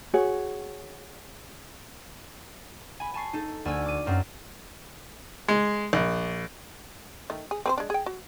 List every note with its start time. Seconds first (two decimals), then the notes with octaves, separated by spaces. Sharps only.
0.14 F#4 G#4 C#5
3.00 G#5 B5
3.14 G#5 A5 C#6 C7
3.33 D#4 A4
3.65 D2 G#5 E6 G#6 D#7
3.86 D6 D#7
4.06 F#2 C4 A#4
5.48 G#3
5.93 A#1
7.30 D#3 A3
7.51 G#4
7.66 C4 B4 C5
7.78 G#3 D4
7.90 G#4 G5
8.06 F#4